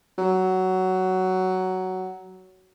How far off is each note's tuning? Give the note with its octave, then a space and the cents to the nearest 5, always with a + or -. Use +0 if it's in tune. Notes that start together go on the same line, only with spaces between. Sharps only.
F#3 +10